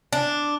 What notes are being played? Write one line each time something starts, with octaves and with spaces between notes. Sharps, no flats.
D4